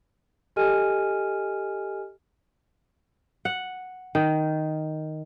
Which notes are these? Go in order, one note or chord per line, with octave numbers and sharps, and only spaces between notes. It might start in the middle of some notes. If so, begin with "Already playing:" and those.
G4 A4 D#5 G#5 F6 D#7
F#5
D#3